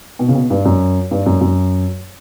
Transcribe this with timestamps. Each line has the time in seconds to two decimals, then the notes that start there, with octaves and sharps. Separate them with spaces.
0.19 B2
0.28 C#3
0.35 B2
0.50 G2
0.65 F#2
1.11 G2
1.26 F#2
1.41 F#2